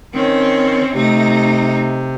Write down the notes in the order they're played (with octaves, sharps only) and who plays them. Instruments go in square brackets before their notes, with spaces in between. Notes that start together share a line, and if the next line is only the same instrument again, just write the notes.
[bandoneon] D#3 [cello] C4 C#4
[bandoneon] C3 [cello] A3 D#4